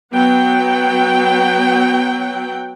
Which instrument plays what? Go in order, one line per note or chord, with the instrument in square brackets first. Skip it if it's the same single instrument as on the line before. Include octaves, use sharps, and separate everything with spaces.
[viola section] F#3 B3 F#5 G5